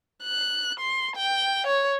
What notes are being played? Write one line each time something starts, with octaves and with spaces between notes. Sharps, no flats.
F#6
C6
G5
C#5